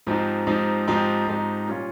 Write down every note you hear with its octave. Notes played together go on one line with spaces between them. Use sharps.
G#2 F3 C4 D#4 G4
G#2 F3 C4 D#4 G4
G#2 F3 C4 D#4 G4
G#2 F3 C4 D#4 G4
A#2 G3 C#4 F4